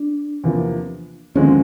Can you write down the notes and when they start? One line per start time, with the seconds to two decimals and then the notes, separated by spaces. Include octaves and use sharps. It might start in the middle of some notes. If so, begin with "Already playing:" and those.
Already playing: D4
0.44 E2 C3 F3 A#3
1.35 D#2 D3 F3 G#3 C4 C#4